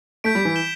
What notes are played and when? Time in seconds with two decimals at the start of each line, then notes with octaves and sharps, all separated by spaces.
0.24 A3 G6 B6 D7
0.35 G3
0.45 E3
0.55 G6 E7 G7